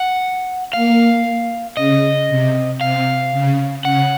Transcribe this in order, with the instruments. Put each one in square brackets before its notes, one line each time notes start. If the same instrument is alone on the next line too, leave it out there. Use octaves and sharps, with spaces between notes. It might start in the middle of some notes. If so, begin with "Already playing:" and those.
Already playing: [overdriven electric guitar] F#5
[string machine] A#3 [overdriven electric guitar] F5
[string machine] C#3 [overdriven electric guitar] D#5
[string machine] C3
[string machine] C3 [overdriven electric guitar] F5
[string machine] C#3
[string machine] C#3 [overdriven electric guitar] F#5